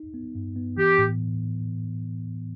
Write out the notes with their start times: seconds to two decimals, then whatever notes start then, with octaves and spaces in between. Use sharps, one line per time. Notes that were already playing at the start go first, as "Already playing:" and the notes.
Already playing: D#4
0.14 B3
0.35 G2
0.56 B3
0.77 E3 G4
0.99 A2